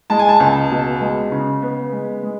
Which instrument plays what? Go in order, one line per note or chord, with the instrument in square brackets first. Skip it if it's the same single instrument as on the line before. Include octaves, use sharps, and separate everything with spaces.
[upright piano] G#3 A5
G#5
A5
C#2
B2
G#3
C#3
B3
G#3
G#3